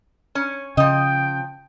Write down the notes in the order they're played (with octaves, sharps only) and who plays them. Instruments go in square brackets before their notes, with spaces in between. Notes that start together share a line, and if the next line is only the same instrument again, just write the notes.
[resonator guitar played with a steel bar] C#4
[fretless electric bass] C#3 [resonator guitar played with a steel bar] F3 D#5 [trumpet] G5